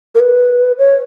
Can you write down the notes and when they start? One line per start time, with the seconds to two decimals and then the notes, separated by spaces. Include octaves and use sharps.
0.15 A#4
0.20 B4
0.78 C#5